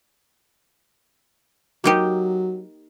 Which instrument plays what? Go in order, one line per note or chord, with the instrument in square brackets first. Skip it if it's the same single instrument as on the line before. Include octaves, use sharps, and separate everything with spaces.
[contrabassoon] F#3 [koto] A#3 D#4 G4